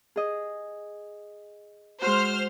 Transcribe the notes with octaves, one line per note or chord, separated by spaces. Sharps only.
G#4 D#5
G#3 F#4 C5 F6